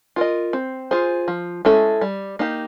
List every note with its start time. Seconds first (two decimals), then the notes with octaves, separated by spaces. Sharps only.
0.16 F4 A#4 D#5
0.53 C4
0.91 F4 G#4 C5
1.28 F3
1.65 G#3 C#4 E4 A4
2.01 G3
2.39 A#3 D#4 G4